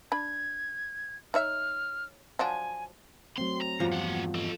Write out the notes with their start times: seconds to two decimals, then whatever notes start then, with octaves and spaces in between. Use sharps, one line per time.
0.12 D4 B5 G#6
1.34 D#4 C#5 E5 F6
2.39 F3 F#3 D4 G#5
3.38 F#3 A3 C4 C6
3.62 A#5
3.80 E2 G2 F3 F#4
3.93 A#3 F#5
4.35 A4 D#5